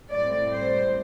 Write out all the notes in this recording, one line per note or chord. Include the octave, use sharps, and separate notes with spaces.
A2 G3 C4 D5
C5